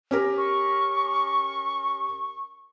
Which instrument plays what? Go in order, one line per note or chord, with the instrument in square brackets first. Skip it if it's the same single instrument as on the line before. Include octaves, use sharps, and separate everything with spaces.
[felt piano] C#4 G4 A#4
[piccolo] C#6